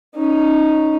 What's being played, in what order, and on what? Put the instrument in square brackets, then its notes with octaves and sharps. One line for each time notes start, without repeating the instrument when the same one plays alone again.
[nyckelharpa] C#4 D#4